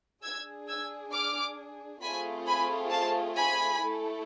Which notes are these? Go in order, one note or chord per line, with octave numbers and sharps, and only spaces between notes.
D4 G#4 E6 G#6
E6 G#6
D6 F6
A3 C4 F4 G#4 G#5 B5
G#5 B5
F5 A5
G#5 B5
A3 E4 A4